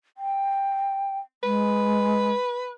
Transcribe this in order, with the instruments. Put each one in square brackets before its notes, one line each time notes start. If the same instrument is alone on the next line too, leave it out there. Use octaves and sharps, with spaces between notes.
[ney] G5
[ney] G#3 [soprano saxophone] B4